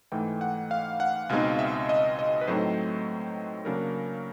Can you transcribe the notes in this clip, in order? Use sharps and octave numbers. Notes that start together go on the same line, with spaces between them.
G#2 E3 A3 G5
F#5
F5
F#5
C#2 B2 G#3 C4 D#4 F5
E5
D#5
D#5
B4
A2 F#3 A3 C4 D#4 C5
C#3 F#3 A#3 D4 A#4